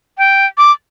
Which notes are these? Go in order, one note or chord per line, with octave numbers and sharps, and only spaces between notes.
G5
D6